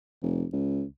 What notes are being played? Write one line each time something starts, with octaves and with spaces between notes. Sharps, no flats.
F1
C#2